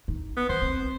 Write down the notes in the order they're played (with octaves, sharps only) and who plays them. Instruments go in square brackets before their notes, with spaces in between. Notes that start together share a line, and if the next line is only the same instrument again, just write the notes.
[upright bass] D#4
[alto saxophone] B3
[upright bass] E3 [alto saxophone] C5
[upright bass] C4